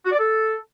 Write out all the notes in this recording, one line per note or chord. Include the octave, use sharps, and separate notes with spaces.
F#4
D5
A4